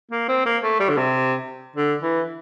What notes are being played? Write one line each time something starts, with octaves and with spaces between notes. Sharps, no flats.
A#3
C4
A#3
A3
G3
D3
C3
D3
E3